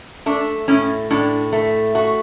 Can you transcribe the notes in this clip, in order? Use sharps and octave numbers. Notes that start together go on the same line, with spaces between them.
A3 D4
A2 C#4
A2 D4
A3
A3 F#4